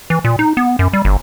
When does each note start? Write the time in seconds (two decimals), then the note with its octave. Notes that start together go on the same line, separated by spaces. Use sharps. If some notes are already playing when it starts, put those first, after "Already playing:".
0.10 E3
0.25 A#2
0.39 D#4
0.57 B3
0.79 F#2
0.93 G3
1.05 G1